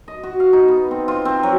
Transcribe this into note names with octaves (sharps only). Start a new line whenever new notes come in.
D#5
F#4
F5
D#4
B3
C4
F4
C4
F#3